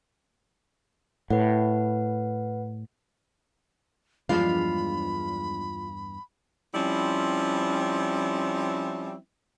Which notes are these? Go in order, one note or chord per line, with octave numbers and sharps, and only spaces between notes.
A2 B4 F#5
E2 G2 F3 G#3 D4 F4 F5 B5
F3 G3 C4 C#4 E4